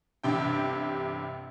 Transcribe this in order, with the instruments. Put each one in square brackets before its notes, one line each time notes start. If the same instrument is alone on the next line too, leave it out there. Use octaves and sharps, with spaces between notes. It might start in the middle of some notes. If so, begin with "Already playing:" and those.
[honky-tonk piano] A1 G2 C3 G5